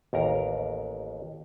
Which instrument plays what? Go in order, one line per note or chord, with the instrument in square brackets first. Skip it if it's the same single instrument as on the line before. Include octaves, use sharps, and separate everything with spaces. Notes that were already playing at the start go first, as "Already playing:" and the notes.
[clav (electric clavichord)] A1 D#2 A#4 A#5